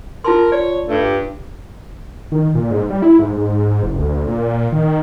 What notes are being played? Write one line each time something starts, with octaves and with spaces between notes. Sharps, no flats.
F4 A#4 A5 C6
C#5 D5
G2 A3
G4
D#3
A#2
G#2
G3
E4
G#2
G#2
F#1
D2
A#2
D#3